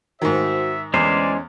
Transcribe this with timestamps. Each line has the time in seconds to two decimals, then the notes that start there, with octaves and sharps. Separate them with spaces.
0.22 G#2 D#3 F#4 C5 E5
0.94 E2 A2 D3 E3 G#3 C#4 C5 D5